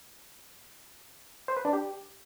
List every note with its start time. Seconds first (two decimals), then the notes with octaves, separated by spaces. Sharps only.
1.48 C5
1.57 B4
1.65 D4
1.73 G4